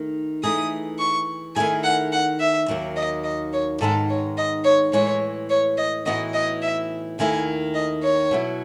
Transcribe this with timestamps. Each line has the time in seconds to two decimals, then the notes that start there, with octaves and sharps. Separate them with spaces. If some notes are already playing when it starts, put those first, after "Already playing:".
Already playing: D#3 A3
0.43 E3 A3 D#4 G#4 D#6
0.99 C#6
1.56 D#3 A3 E4 G#4 G#5
1.84 F#5
2.13 F#5
2.40 E5
2.68 D#2 D#3 F#3
2.97 D#5
3.24 D#5
3.53 C#5
3.81 G#2 D#3 G#3 B3 D#4 A4
4.09 C#5
4.38 D#5
4.65 C#5
4.93 A2 E3 G#3 C#5
5.50 C#5
5.78 D#5
6.06 A2 E3 B3 D#4 F#4 D#5
6.34 D#5
6.62 E5
7.19 D#2 D#3 A3 E4 G#5
7.75 D#5
8.03 C#5
8.31 B2 F#3 B3 E4